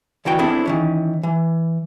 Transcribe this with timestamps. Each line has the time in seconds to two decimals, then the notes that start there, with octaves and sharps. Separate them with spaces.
0.25 D2 E3 F#4 G5
0.39 B3 C4 D4 E4 G#4 A4
0.65 D#3 E3 C#4
1.23 E3